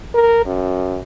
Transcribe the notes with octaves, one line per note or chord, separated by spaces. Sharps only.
A#4
F#2